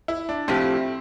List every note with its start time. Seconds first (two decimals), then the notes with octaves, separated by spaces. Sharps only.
0.08 E4
0.29 D4
0.48 A2 F3 A3 C4 E4 G4